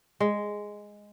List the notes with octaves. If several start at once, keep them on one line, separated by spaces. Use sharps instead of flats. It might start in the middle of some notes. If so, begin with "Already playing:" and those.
G#3